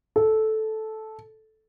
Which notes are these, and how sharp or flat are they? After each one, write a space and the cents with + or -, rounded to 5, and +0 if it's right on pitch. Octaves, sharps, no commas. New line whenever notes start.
A4 -10